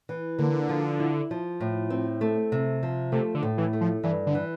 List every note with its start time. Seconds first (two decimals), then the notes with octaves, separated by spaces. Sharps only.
0.09 E3
0.38 D3 A#3
0.69 F3
1.00 E4
1.31 F3
1.60 A2
1.90 C4
2.21 A3
2.52 C3
2.83 F3
3.12 C3 A3
3.35 D3
3.43 A2
3.58 E3
3.73 A3
3.81 F3
4.04 G2 E3
4.27 D3
4.35 E3